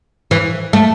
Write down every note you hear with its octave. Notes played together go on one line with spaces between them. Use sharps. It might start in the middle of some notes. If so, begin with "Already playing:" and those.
E3
A3